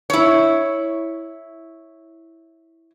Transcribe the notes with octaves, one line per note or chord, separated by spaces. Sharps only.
E4 C#5